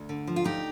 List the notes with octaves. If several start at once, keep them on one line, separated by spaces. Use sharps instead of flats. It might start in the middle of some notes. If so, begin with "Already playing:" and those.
Already playing: D2
D3
F3
F4
D2 D#4 G4